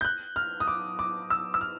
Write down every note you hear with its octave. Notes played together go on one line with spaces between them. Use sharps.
G6
F#6
F6
D#6
D6
D6
E6
E6
F6